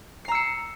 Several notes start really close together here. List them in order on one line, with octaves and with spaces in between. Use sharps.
C7 A#5 E6 C#7